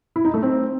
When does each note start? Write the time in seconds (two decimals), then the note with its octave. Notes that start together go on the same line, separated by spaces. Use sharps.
0.16 E4
0.25 D#4
0.34 A3
0.43 C4